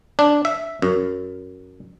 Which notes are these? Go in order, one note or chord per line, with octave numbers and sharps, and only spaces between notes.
D4
E5
F#2